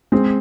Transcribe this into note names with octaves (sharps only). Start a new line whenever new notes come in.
G#3 C4